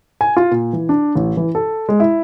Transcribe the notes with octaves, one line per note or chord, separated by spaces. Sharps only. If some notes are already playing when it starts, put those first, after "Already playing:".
G#5
F4
A#2
E3
D4
A1
E3
A4
G#3
E4